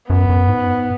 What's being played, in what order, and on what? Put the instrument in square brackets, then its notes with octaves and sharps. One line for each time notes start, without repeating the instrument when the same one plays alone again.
[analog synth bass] F#2 [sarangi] B3
[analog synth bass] F#2
G#2